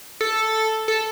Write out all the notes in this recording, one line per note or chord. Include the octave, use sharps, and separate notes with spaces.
A4
A4